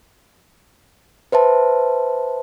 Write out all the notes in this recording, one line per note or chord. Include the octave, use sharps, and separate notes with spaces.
B4 C5 E5 A5